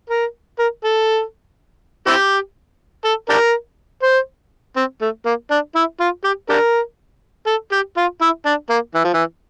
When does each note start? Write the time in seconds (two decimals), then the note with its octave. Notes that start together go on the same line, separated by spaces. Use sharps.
0.10 A#4
0.59 A#4
0.84 A4
2.07 C4 E4 G4
3.05 A4
3.29 D4 G4 A#4
4.03 C5
4.76 C4
5.01 A3
5.25 A#3
5.51 D4
5.75 E4
6.00 F4
6.24 G4
6.49 D4 G4 A#4
7.47 A4
7.72 G4
7.97 F4
8.21 E4
8.46 D4
8.70 A#3
8.94 E3
9.04 F3
9.13 E3